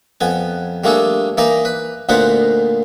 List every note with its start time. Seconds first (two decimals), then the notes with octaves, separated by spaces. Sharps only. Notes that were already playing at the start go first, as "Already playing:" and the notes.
0.21 F2 B3 G#5
0.84 G3 A3 A#3 D4 G#4 A4
1.37 E3 A#3 D#4 D5 D#5
1.65 B4
2.09 D2 A#2 B3 D#4 C5 F#5